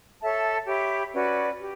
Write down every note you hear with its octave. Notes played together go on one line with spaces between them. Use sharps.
A4 C#5 E5 A5
G4 C#5 E5 B5
C#4 F#4 B4 D5
G4